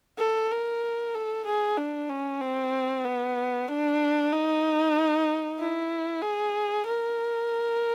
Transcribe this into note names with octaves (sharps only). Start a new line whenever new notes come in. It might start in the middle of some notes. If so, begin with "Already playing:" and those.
A4
A#4
A4
G#4
D4
C#4
C4
B3
D4
D#4
E4
G#4
A#4